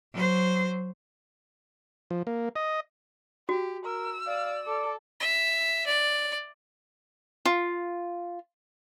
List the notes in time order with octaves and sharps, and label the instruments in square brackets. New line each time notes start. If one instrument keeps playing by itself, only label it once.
[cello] F#3 C5
[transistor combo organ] F3
A#3
D#5
[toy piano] F#4 [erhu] G4
[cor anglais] A#4 [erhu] E6
[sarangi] D5 [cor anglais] F5
[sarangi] A4 [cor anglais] D5
[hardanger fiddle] E5
D5
[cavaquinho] F4